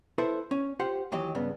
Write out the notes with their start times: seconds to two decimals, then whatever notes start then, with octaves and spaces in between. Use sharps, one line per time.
0.18 E4 A4 B4 C5 E5
0.51 C#4
0.79 F4 G4 C5 F#5
1.12 D#2 E3 F#3 G4 D#5
1.35 G2 C#3 B3